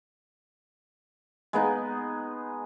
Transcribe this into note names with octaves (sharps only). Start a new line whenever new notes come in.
G#3 B3 D#4